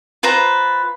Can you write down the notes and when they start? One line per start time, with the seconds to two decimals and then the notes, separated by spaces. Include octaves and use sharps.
0.23 F4 B4 C5 A#5